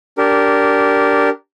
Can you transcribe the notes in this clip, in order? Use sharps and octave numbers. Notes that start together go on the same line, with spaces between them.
D4 G4 A#4